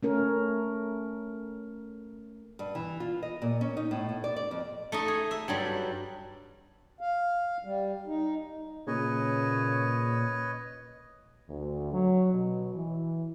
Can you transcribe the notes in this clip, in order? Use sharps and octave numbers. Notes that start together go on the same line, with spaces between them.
A3 C#4 A#4
G2
E3
F4
D#5
A#2
C#4
D#4
A2
A2
D5
D5
F2
A3 D#4 D#5
G#4
E5
G2 F#3 G3
F5
G3
D#4
A#2 C#3 B4 C#5 D#5
D2
F#3
B2
E3